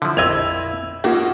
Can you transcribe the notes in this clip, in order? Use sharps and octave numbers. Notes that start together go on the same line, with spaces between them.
D3 F3 E4
A#1 F2 D#5 E6 G#6 F7
B2 A3 A#3 C#4 F4 F#4